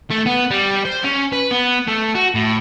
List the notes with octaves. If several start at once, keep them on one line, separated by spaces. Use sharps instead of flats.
A3
B3
G3
C5
C#4
B4
B3
A3
F#4
A2